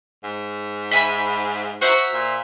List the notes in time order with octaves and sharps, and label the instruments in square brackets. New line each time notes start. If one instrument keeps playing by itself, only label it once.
[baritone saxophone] G#2
[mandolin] E5 G#5 B5
[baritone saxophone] F#4 [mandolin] C5 E5 A#5
[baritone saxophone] A#2